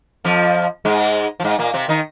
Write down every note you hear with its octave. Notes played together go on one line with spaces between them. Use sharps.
F2 F3
G#2 G#3
F3
G#2 G#3
A#2 A#3
C3 C4
D#3 D#4